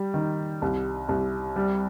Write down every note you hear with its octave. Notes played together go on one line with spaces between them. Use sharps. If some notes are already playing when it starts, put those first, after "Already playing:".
Already playing: G3
D#3
C2
C2
G3